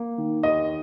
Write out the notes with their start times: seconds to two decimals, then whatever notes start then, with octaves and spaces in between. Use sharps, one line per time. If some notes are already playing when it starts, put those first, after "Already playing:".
Already playing: A#3
0.18 D#3
0.43 D#2 D#5